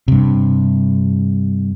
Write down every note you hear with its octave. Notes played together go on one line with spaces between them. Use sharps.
G2 C3